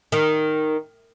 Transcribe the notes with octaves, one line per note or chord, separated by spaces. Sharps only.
D#3